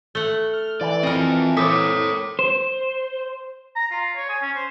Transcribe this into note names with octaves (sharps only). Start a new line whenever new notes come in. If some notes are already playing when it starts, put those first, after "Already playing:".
A3 F#5 G7
F6
E3 D5
C4 F4 A#4 D#5
A#3 C4 A4 C#5 D6 D#6 B6
C5
A#5
F4
C#5
G#5
C#4
C5